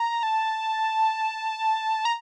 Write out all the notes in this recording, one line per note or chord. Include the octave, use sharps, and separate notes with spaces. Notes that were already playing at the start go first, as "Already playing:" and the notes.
Already playing: A#5
A5
A#5